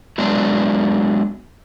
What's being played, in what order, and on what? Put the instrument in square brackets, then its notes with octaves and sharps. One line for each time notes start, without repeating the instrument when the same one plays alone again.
[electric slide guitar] F#3 G#3 B3 D4